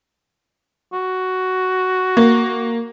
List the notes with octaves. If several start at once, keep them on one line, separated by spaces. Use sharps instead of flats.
F#4
A#3